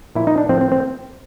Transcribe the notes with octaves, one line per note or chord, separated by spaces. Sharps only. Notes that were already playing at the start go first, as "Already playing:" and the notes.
A#2 F3 E4
D#4
D4
A2 F3 C4
C4
C4